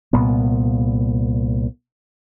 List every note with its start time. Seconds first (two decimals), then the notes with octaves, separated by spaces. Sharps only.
0.13 C2 A#2 B3